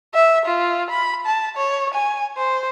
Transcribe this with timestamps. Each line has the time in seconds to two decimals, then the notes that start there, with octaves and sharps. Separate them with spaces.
0.14 E5
0.45 F4
0.90 B5
1.26 A5
1.57 C#5
1.94 G#5
2.37 C5